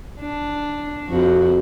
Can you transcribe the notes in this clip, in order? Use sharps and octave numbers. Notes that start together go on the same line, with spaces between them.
D4
F2 F#4